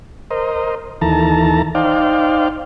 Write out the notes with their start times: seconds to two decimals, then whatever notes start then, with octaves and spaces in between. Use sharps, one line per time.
0.31 A#4 C5 D#5
1.01 D#2 E3 A4 A5 A#5
1.75 D#4 C5 D5 F5 G5